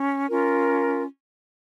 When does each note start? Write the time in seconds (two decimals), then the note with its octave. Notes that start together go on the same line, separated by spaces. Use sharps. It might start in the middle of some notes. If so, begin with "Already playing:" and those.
Already playing: C#4
0.28 C#4 F4 A#4